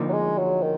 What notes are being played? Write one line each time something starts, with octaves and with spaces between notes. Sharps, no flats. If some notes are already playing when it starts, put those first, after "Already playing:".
Already playing: D2 D3 F3 A#3 D#4
F#3
G#3
F#3
D#3